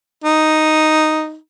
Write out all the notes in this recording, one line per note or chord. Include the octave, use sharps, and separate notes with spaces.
D#4